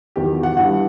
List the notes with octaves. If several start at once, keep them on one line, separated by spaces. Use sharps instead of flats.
E2 D#3 F#3 G4
F#5
G2 E3 G3 F#5